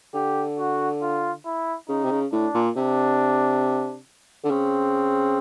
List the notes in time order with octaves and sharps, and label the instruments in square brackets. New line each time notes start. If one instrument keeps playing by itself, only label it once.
[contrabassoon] D3 [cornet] G4
[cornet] F#4
F4
E4
[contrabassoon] C#3 [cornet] D#4
[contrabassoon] C3
C#3
[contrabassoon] A2 [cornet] D4
[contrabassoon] A#2
[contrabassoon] C3 [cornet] D4
[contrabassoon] D3
[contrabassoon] C#3 [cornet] C4